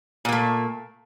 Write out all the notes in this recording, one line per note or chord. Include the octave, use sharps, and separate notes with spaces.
A#2 A3 A#3